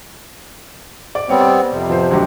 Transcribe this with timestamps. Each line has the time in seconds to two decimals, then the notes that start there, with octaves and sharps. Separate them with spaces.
1.15 D5
1.29 G3 B3 C4 C#5
1.41 D5
1.72 F2 C3
1.90 F3 B3 C5
2.11 D2 F#3 G4